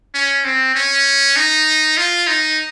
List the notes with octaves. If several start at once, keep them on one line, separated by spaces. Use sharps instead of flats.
C#4
C4
C#4
D#4
F4
D#4